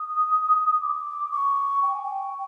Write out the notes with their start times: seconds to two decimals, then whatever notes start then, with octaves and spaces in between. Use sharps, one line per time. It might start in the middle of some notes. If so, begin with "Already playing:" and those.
Already playing: D#6
0.81 D6
1.32 C#6
1.83 G5
1.93 G#5
2.03 G5